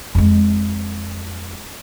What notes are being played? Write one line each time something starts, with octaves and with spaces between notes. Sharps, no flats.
F2 G#3